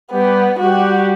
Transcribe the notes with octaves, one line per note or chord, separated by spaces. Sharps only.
G3 B3 G4
G3 F#4 G4